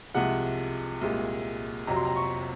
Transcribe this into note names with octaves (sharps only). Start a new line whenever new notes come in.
C2 C3 F3 G#3 F#5
C2 A#2 G#3
F2 C3 F#3 A#5
C6
A#5
C#6